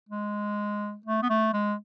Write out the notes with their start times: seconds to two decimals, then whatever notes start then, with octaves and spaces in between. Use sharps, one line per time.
0.09 G#3
1.06 A3
1.22 B3
1.29 A3
1.53 G#3